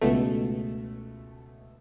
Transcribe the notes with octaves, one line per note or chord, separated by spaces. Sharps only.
C#2 B2 A3